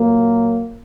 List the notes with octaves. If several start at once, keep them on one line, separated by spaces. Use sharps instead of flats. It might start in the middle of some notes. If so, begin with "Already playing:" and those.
Already playing: A#2 F#3 A#3